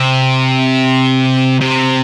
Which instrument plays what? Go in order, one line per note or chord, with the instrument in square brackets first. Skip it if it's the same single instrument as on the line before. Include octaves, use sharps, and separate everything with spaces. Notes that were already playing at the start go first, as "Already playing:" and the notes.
Already playing: [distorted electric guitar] C3
C3